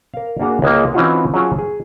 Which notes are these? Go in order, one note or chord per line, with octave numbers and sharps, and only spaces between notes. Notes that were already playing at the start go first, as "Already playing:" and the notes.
A#4 F5
A#3 D4 F#4 G#4 A#5
C#2 G#3 A#3
E3 C4 C#4 D#4 F4 F#4
F#3 C#4 F4 G#4 G#5 A5
G#4